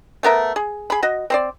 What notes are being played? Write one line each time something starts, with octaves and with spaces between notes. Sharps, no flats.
A3 B3 A#4 E5
G#4
G#4 B5
F#4 D#5
C4 C5 D5